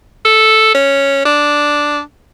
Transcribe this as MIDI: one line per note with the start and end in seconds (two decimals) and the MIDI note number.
0.25 0.73 69
0.74 1.25 61
1.25 2.00 62